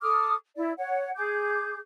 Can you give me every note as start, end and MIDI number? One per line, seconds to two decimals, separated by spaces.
0.02 0.35 69
0.02 0.35 86
0.02 0.35 87
0.02 0.35 89
0.56 0.72 64
0.56 0.72 74
0.77 1.10 73
0.77 1.10 78
1.15 1.78 68
1.15 1.78 86
1.15 1.78 91